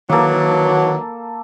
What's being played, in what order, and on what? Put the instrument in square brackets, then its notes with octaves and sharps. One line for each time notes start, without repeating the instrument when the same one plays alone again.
[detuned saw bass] D#3 [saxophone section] E3 F#3 [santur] A#3 A4